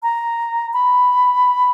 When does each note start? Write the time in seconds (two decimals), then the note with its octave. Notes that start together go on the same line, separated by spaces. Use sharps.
0.03 A#5
0.73 B5